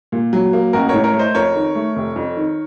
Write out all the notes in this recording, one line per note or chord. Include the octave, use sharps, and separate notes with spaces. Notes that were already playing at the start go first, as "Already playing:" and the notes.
A#2
F#3
A#3
A1 F#4 A#4
A2 A#4 C#5
A#4 C#5
A3
C5 D#5
F2 A#4 C#5
D#3
A3
F1
F2
D#3